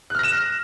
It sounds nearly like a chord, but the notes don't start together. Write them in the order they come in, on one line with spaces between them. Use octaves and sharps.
F#6 F6 A#6 E7